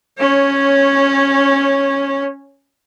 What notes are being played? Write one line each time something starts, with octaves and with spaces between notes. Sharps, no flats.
C#4 C#5